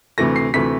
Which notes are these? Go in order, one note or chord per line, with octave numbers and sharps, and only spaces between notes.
D2 C3 E3 A3 A#6
C7
D2 C3 E3 A3 B6